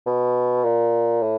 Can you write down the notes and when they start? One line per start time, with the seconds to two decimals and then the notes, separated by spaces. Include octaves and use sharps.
0.06 B2
0.64 A#2
1.22 A2